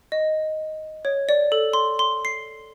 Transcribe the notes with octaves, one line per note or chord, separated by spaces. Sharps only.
D#5
C#5
D5
A4
C6
C6
C7